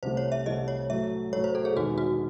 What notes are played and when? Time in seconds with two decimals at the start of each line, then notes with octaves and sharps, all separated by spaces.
0.03 C2 C3 E3 A3 C5
0.17 C#5
0.32 E5
0.46 C2 C3 E3 A3 D#5
0.68 C#5
0.89 A2 F#3 A3 E5
1.33 A2 F#3 A3 C#5
1.44 C5
1.55 A4
1.65 G#4
1.76 E1 E2 D#3 F#4
1.98 F#4